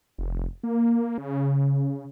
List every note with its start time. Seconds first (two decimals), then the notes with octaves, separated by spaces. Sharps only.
0.18 F1
0.63 A#3
1.18 C#3